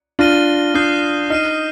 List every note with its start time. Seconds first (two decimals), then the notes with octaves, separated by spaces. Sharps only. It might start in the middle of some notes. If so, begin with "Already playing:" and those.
0.19 D4 F4 F6 A#6 D#7 G7
0.74 D4 D#6 G6 C7
1.30 D#4 F6 C7 D#7